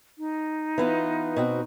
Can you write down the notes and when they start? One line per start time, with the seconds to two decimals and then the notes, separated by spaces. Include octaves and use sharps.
0.18 D#4
0.78 E3 B3 F4
1.36 B2 C4 F#4